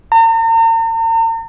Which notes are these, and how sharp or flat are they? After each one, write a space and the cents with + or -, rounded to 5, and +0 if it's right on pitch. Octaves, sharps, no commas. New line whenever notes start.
A#5 -45